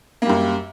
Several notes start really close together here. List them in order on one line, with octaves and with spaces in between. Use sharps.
A#3 G3 F#2